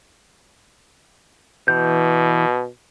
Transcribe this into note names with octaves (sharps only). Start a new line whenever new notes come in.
B2 E3 G6